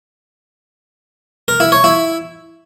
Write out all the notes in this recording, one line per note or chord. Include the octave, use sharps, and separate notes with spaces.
A#4
E4
C#5
E4